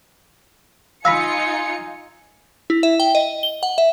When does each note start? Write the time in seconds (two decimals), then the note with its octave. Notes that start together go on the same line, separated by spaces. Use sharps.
1.05 D#4 F4 F5 G#5 A#5 B5 E6 C#7
2.70 E4
2.83 E5
3.00 G5
3.15 D#5
3.43 G7
3.63 F#5
3.78 E5